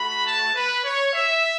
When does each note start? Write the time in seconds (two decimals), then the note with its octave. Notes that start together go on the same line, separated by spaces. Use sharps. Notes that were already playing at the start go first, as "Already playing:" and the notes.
Already playing: A3 F#4 B5
0.25 A5
0.55 B4
0.84 C#5
1.14 E5